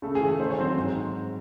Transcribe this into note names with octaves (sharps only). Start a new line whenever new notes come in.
C#3 A3 A4
G#4
E3
A3 A4
D#3 C5
C#5
F#3 C4 C5
G#2